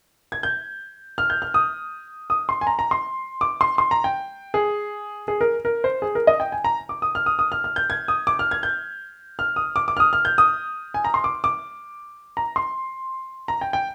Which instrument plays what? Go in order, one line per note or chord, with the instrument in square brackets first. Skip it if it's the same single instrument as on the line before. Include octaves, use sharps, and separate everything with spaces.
[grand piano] G#6
G6
F6
G6
F6
D#6
D#6
C6
G#5
A#5
A#5
C6
D6
C6
C6
A#5
G5
G#4
G#4
A#4
A#4
C5
G#4
A#4
D#5
G5
G#5
A#5
D6
D#6
F6
D#6
D#6
F6
F6
G6
G#6
D#6
D6
F6
G#6
G6
F6
D#6
D6
D6
F6
D#6
F6
G6
D#6
G#5
A#5
C6
D6
D6
A#5
C6
A#5
G5
G5